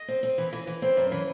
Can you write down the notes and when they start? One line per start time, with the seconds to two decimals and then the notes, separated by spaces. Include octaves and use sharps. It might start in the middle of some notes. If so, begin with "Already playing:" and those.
Already playing: D#5
0.08 C4
0.23 C4
0.38 E3
0.53 E3
0.67 E3
0.82 C4
0.97 F#2
1.12 E3